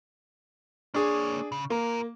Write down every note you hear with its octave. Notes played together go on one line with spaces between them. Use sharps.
A#3 D4 G#4 C#5
C#3
A#3 F4 A#4